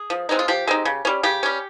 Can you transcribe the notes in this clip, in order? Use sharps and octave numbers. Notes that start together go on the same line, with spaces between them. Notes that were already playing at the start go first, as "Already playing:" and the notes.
Already playing: G#4
F3
G#3 C4 D#4
F4
F3 G4
G#3 C4 D#4
C#3
G3 C#4
C#3 G4
G3 C#4